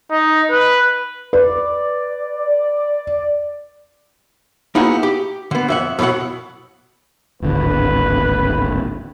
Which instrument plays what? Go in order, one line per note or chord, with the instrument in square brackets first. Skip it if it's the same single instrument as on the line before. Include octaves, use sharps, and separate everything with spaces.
[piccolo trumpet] D#4
B4
[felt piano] B4 [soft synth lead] D5
[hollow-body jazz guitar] A#3 B3 D#4 E4 F#4 G#4
G4
D3 B3
F2 E5 F#5
F2 B2 E3 F#3 F#5
[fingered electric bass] D1 G#1 D3 [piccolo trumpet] B4